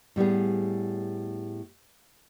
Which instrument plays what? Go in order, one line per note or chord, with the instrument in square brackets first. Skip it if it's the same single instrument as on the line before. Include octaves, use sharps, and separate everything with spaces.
[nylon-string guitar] A2 G3 B3 G#4